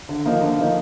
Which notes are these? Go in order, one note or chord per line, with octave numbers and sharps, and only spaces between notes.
D3
F3 A#3 D#4
D3
F3 A#3 D#4